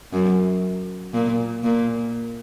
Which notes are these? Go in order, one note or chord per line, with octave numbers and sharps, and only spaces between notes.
F#2
A#2
A#2